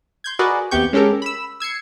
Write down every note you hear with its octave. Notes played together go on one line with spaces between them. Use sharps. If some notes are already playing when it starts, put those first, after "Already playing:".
C6 G6 G#6
F#4 G#4 A#4 B4 D5 D#5
D#2 C3 B3 G4 C#6 G6
G#3 C#4 G4 A4 A#4
B5 E6
E6 G#6 C7 C#7